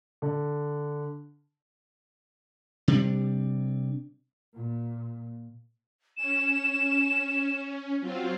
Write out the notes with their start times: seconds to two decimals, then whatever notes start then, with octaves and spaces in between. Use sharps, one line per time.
0.22 D3
2.88 C3 G3 D4
4.53 A#2
6.17 C#4 E7
8.00 F#3 C4 F4